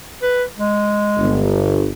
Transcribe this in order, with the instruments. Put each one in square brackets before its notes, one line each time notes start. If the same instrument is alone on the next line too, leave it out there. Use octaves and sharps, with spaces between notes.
[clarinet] B4
G#3
[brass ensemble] G1